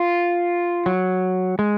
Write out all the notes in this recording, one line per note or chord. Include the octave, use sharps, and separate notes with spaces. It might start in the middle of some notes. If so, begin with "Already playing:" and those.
Already playing: F4
F#3
G#3